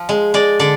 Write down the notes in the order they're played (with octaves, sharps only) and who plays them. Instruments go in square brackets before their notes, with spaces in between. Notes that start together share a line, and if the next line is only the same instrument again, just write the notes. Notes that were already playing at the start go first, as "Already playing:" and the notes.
Already playing: [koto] F3
G#3
G#3 D5
D3 D5